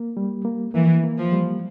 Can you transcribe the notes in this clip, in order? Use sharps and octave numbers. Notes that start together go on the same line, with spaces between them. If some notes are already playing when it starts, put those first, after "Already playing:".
Already playing: A#3
G3
A#3
E3 A#3
A#3
F3
G3